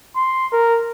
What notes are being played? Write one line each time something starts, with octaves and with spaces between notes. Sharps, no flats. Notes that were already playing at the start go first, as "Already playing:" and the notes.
C6
A#4